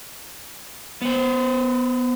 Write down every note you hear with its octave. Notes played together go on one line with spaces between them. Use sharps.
B3 C5